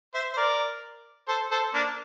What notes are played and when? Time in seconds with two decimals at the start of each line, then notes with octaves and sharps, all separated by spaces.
0.14 C5 E5
0.33 C5
0.37 A#4 D5
1.28 A4 C5
1.51 A4 C5
1.74 A#3 D4